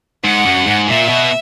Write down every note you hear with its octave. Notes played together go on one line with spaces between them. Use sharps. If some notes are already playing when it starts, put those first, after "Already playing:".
G#2 F#5
F#2
G#2
A#2 E5
B2